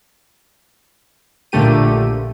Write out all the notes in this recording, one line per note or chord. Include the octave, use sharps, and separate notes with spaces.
A#1 A#2 D3 A3 G4 D#7